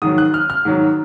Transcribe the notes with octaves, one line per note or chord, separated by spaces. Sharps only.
G#2 D#3 F#3 D#6
F#6
F6
F6
G#2 D#3 F#3